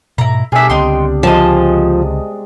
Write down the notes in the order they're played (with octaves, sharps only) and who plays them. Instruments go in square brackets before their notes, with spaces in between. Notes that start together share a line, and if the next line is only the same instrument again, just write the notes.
[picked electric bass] G#2 B2 [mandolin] E4 A#5
[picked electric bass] B2 [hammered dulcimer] G3 B3 D4 [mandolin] G#4 E5
[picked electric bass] C#2 D3 C4 [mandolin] D#4 G5 C6
[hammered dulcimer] C3 G#3 [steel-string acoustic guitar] F3 [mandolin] D#5 A5